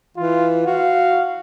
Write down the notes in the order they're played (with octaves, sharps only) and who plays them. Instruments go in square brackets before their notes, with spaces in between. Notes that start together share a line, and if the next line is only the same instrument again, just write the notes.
[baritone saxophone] E3 [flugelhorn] F4
[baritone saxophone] F#4 [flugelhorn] F5